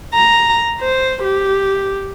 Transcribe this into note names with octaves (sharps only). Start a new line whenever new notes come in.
A#5
C5
G4